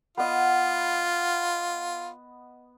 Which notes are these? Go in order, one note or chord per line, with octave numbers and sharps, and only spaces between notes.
B3 F4 D#5